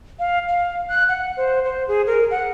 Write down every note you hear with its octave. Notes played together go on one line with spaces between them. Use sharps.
F5
F5
F#6
F#5
C5
C5
G#4
A#4
F#5